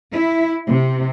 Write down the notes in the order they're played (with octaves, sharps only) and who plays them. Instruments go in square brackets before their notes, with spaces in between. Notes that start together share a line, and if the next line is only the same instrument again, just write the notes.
[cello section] E4
C3